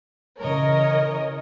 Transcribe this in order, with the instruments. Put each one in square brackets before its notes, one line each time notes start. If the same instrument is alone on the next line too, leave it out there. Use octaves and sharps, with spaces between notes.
[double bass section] C#3 E3 [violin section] A#4 C#5 D#5